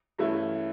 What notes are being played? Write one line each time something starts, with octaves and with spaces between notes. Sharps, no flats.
G2 E3 A3 C#4 E4